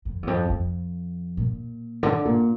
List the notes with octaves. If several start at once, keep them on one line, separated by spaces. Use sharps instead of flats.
F2
E2
F2
F2
A#2
D3
A#2